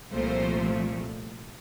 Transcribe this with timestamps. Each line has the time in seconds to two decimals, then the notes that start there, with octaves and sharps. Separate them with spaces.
0.11 C2 A#2 F3 A3 C5